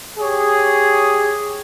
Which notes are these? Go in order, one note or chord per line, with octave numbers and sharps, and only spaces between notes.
G4 G#4 C#5